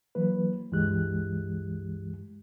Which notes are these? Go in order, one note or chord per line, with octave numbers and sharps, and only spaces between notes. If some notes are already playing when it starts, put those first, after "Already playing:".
E3 F#3 A#3 B4
C#2 G2 E3 G#3 G4 F#6